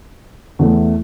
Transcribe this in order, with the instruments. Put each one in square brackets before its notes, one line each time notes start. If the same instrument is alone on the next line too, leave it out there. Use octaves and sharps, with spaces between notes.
[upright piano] E2 E3 A3